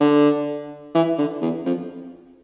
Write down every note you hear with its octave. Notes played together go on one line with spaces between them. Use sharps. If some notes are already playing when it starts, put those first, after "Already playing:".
D3
E3
D3
E2
F2